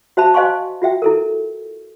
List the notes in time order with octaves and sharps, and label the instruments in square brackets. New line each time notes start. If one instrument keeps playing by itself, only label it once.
[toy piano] F#4 C5 E5 A5 B5
C5 D#5 F5 G#5 C6 C#6
F4 F#4 E5 G5
E4 A4 A#4